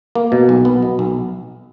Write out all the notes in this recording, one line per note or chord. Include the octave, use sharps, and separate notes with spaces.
A#3
B2
B1
B3
B2
B1